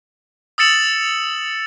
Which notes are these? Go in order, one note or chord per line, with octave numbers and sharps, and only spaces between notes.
D#6 E6 A6 C#7 E7 F#7